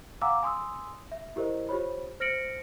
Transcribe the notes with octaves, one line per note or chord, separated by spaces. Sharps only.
F5 F#5 G#5 A#5 D6 E6
G#5 C6 D#6 E6
E5
E4 G4 A#4 C5 D#5
F4 G4 C5 C#5 B5
C5 F6 A#6 C#7 D7 F#7